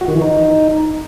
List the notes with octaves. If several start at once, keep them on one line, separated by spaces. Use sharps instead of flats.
F#4
D#3
E3
D#4